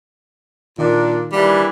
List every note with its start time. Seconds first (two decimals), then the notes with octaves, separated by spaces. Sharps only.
0.79 A#2 D#3 A#3 D4
1.32 E3 G3 A#3 D4